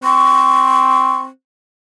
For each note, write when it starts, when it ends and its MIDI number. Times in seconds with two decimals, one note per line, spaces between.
0.04 1.29 60
0.04 1.21 85